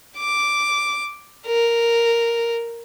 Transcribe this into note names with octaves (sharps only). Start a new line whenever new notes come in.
D6
A#4